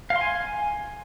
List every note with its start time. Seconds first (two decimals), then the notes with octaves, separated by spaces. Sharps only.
0.10 F5
0.16 C6
0.21 G#5